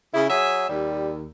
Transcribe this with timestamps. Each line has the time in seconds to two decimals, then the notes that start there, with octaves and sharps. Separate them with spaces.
0.13 C#3 E4
0.29 F#3 G#4 E5
0.69 D#2 G3